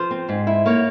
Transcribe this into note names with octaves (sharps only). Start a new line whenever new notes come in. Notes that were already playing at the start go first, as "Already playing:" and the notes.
Already playing: F3 C5
C4
G#2
E4
A#3 C#5